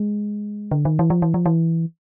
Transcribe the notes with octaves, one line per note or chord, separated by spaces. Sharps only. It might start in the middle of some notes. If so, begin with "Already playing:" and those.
Already playing: G#3
D3
D#3
E3
F3
E3
F3
E3